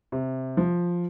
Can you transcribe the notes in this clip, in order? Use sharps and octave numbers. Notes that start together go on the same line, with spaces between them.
C3
F3